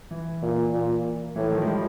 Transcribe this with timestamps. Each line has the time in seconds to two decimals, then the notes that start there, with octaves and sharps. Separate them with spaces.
0.11 E3
0.42 A#2
0.74 A#2
1.36 A2 E3
1.52 D#3 F3
1.62 G#3
1.67 F3 G3